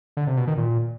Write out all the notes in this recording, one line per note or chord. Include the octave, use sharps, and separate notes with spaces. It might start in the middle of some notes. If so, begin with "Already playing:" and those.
D3
C3
B2
D#3
A#2